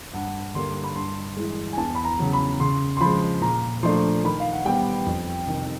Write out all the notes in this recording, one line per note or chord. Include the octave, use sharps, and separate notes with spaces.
G2 F#5
D3 G3 A#3 C6
B5
G2 C6
E3 G#3
G#5
E2 A5
B5
A#5
C#3 F#3
B5
C#3 C6
C6
F3 B5
G#3
A#2 A#5
F3 A3 D4 C6
D#3 B5
F5
F#5
G3 B3 G5
F2
C3 D#3